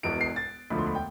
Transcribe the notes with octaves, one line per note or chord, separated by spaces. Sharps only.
E1 E2 B2 B3 D7
C7
A6
E1 D2 D3 F3 B5
C6
B5
G5